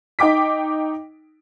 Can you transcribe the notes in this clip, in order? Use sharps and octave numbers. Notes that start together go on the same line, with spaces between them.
D#4 G5 D6 B6